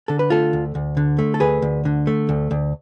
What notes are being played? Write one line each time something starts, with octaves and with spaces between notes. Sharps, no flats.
D3 A4
B4
A3 F4 A4
D2
D2
D3
A3
A4
D2 G#4 B4
D2
D3
A3
D2
D2